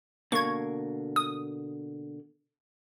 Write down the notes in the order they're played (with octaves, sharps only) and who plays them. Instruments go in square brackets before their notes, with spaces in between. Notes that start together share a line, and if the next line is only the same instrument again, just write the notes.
[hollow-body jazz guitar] B2 D3 A#3 [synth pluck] C#6 G#6
[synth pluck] D#6